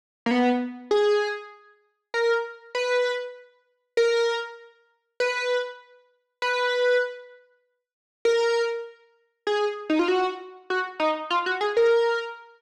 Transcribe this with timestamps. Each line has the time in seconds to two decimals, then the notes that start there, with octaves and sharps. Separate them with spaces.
0.26 A#3
0.31 B3
0.91 G#4
2.14 A#4
2.75 B4
3.97 A#4
5.20 B4
6.42 B4
8.25 A#4
9.47 G#4
9.90 D#4
9.99 F4
10.08 F#4
10.70 F#4
11.00 D#4
11.30 F4
11.46 F#4
11.61 G#4
11.77 A#4